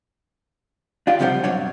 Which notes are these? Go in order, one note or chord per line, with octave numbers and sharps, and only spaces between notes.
D4 F4 G4
C#2 C3 F3 G3 C5 F#5
G2 B2 F#3 D4 C#5 F#5